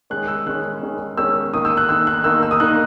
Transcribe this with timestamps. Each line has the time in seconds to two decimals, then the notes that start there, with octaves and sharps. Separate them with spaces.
0.10 D#3 G#3 C#4 F#6
0.28 E6
0.46 D#3 G#3 C#4 F#6
0.82 D#3 G#3 C#4
1.17 D#3 G#3 C#4 E6
1.53 D#3 A#3 D#4 D#6
1.65 E6
1.77 F#6
1.88 D#3 A#3 D#4 E6
2.07 F#6
2.24 D#3 A#3 D#4 E6
2.43 E6
2.51 D#6
2.60 D#3 A#3 D#4 F#6